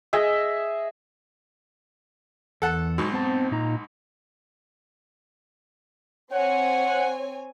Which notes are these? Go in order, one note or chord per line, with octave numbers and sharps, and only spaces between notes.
G#4 D#5 E5
E2 A4 F#5 A5
B1 G#2 F#4
B3 C4 A5
A#2 D#4 A#5
C4 C#5 F#5 G#5